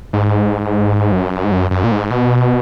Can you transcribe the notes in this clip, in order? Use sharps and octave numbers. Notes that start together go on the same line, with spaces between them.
G#2
F#2
G#2
F#2
F#2
A#2
G#2
B2